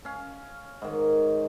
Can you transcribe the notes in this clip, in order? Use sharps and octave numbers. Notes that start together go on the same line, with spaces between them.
C#4 F5
G#2 D#3